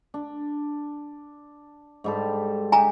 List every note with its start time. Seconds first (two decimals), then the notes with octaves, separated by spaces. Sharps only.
0.14 D4
2.04 G#2 G3 A4
2.72 D#4 G4 G#5 A#5